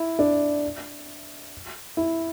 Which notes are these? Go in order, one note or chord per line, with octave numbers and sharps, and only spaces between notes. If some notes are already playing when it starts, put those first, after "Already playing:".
Already playing: E4
D4
E4